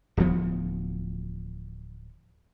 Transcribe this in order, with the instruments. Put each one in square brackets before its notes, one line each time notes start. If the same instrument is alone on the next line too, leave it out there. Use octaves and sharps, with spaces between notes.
[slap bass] D1 D2 F3 B3